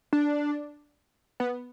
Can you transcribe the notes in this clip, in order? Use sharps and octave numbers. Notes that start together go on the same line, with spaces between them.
D4
B3